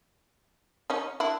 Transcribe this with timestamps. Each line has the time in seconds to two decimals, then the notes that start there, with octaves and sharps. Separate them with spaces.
0.90 C#4 D#4
1.20 D4 E4